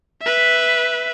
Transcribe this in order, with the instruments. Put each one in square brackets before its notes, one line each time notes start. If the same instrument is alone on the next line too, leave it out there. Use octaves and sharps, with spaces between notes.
[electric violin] B4 E5